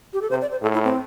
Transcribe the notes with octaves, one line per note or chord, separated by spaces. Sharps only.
G4
A4
C3 C5
D5
C5
A2 A4
E4
C4